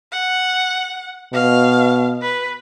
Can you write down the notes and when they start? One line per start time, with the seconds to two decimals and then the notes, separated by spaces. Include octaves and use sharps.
0.12 F#5
1.34 B2 F5
2.22 B4